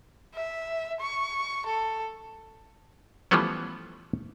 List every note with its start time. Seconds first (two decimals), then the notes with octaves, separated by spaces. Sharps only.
0.34 E5
1.00 C#6
1.66 A4
3.31 E3 F3 G3 A3 B3 C#4